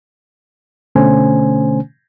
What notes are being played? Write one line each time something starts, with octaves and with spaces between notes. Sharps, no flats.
B2 D3 A3 C#4 C5 G#5